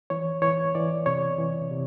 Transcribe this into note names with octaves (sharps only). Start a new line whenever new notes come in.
E3 C#5
E3 C#5
E3 D5
C3 C#5
E3
C3